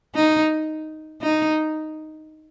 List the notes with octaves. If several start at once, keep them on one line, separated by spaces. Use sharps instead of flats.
D#4
D#4